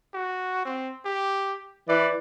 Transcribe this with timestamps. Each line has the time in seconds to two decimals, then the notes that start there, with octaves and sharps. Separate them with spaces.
0.14 F#4
0.65 C4
1.05 G4
1.88 E3 D5